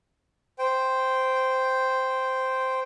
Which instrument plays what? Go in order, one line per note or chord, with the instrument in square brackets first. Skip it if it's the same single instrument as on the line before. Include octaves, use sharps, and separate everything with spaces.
[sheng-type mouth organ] C5 G5